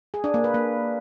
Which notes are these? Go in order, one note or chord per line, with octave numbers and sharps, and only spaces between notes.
G#4
D4
A#3
B4
A#3